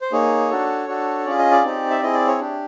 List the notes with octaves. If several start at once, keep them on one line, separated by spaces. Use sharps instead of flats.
C5
A#3 D#4 G#4 C#5
D4 F#4 A4
D4 F#4 A4
C#4 F4 G#4 D5
D#5
D5
C4 D#4 G4
E5
C4 E4 G#4 D#5
D5
C#5
D4 G4